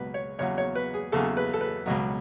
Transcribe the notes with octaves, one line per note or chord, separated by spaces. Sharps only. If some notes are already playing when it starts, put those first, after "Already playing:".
Already playing: C#2 B2 F#3 B4
C#5
E2 C#3 F#3 C#5
C#5
B4
G#4
E2 C#3 F#3 A4
B4
A4
B4
C#2 B2 F#3